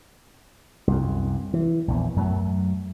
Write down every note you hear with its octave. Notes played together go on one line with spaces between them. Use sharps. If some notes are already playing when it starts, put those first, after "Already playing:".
C2 F#2
E3
A#1 E2
F#2 F#3 A3